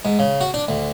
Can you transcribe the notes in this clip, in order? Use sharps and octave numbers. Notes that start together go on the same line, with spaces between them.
G#2
C#3
F#4
D4
D2